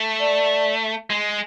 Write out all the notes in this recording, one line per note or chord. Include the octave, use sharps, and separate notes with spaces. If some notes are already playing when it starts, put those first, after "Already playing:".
Already playing: A3
D5
G#3